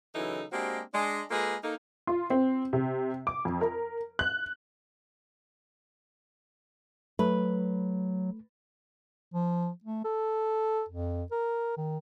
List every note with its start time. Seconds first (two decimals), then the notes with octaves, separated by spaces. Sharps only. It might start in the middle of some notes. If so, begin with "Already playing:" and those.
0.15 C#3 E3 F#3 D#4 E4 A4
0.52 G#3 A#3 C4 D4 F#4 G4
0.94 G#3 D4
1.30 G#3 A#3 F4 G#4 A4 B4
1.64 A#3 D#4 A4
2.07 F4
2.30 C4
2.73 C3
3.27 D6
3.45 F2
3.61 A#4
4.19 F#6
7.19 F#3 A3 B4
9.34 F3
9.84 A3
10.05 A4
10.89 F2
11.32 A#4
11.77 D#3